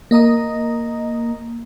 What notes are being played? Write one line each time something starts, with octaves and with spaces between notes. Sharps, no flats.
A#3 D#5 A#5 D#6